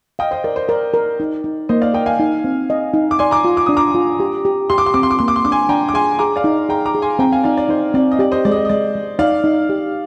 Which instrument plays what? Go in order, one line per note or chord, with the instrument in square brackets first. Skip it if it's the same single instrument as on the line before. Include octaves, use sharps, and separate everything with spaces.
[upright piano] D#5 G5 [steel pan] F5
[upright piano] C5 D#5
[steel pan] A#4 [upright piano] D5
[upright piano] C5
[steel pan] A#4 [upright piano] D5
[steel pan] A#4
D#4
D#4
[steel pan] A#3 [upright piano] C5 D#5
[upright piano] D5 F5
[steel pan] A#4 [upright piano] D#5 G5
[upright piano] F5 G#5
[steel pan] D#4
C4
D#5
D#4
[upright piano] D6
[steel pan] D5 [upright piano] G#5 C6
[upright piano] A#5 D6
[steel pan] F4
[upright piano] D6
[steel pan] D4 [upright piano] D#6
[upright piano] A#5 D6
[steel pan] F4
G4
G4
[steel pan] G4 [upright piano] C6
[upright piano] D6
C6
[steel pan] C4 [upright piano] D6
[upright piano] C6
D6
[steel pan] A#3 [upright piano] C6
[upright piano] D6
C6
[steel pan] D4 [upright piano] D6
[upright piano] G#5 C6
[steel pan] D4 [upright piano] G5 A#5
[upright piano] D6
[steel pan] G#4 [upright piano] G#5 C6
[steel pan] G#4 [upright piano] A#5 D6
[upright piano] D5 F5
[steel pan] D#4
[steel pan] G#4 [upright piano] G5 A#5
[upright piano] A#5 D6
[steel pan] G#4
[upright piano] G#5 C6
[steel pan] C4 [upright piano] G5 A#5
[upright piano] F5 G#5
[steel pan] D#4 [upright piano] D5 F5
[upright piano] D5
[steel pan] D#4 [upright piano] C5
[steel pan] C4 [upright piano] D5
[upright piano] D#5
[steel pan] G4 [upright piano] D5
[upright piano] C5 D#5
[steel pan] G#3 [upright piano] D5
[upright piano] D#5
D5
D#5
[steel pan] G#3 [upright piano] D5
[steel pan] G#3
[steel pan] D#4 [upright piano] D5 F5
[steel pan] D#4
G4